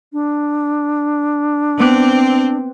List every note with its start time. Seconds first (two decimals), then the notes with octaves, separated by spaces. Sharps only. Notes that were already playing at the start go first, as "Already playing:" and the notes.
0.13 D4
1.80 B3 C4 D6 F#6